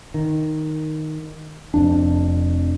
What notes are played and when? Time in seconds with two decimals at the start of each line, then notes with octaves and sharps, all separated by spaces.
0.14 D#3
1.74 F1 F2 D4